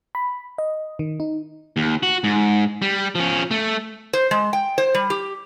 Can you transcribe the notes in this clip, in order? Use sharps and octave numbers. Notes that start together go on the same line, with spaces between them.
B5
D#5
D#3
D#4
D#2
F#4
G#2
G3
F3 C#4
A3
C5
G#3
G5
C5
G3
G4